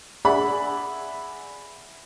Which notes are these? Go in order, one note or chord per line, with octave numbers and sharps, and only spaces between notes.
G#4 D5 E5 F#5 B5